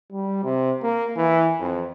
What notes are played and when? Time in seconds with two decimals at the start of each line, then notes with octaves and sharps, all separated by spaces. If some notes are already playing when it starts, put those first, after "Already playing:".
0.12 G3
0.43 C3
0.83 A#3
1.16 E3
1.60 F2